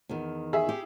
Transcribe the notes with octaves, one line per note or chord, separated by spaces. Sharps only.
E2 D#3
G#4 E5
E4 G4